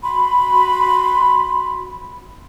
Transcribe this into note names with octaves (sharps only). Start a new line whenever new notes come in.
F#4 B5 C6